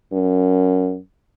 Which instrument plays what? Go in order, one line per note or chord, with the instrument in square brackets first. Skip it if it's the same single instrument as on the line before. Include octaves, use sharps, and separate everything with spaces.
[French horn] F#2